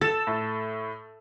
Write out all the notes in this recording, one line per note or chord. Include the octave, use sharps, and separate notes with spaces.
A4 A6 E7
A2